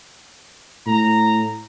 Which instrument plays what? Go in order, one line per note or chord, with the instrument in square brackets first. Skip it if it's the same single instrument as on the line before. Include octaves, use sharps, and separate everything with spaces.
[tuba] A2 [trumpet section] A#5